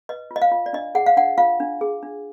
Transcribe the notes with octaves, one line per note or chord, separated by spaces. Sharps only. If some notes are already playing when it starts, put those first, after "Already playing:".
B4 D#5
F4
D#5
F5
F4
D5
D4 D#5
G#4 F#5
F5
D4 F#5
F4 F5
D4
G#4
D4